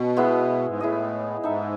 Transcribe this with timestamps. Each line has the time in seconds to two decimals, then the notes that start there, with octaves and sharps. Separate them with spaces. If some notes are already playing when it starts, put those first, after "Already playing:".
Already playing: B2 C#4
0.16 G#3 B3 E4
0.67 G#2
0.80 A2 E4 G#4 D#5
1.43 G#2 D#4 A4 E5